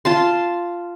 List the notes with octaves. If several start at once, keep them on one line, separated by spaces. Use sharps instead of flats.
F4 A5 C6